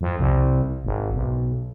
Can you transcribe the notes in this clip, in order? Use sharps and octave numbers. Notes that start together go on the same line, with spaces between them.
F2
C2
G#1
B1